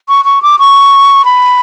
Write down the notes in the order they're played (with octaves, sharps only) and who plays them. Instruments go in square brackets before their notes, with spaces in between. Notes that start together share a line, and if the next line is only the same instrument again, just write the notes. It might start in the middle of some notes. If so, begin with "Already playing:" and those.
[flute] C#6
C#6
D6
C#6
B5